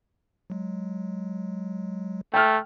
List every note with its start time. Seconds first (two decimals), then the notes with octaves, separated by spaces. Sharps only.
0.50 F#3 G#3
2.34 A3 G5 F6